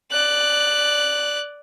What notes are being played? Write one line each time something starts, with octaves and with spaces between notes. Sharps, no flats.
D5 F#6